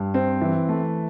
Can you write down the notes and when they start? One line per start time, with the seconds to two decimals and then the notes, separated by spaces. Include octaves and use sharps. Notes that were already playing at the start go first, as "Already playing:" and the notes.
Already playing: G2
0.14 C4
0.41 E3
0.69 A3